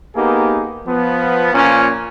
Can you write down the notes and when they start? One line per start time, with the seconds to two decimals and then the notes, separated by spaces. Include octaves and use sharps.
0.15 A#3 B3 D#4 G4 G#4
0.86 F3 B3
1.53 A#2 F3 C#4